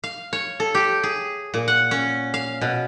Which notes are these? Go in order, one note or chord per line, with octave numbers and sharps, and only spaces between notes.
F5
C#5
A4
G4
G#4
A#2
F#5
C#4
F5
B2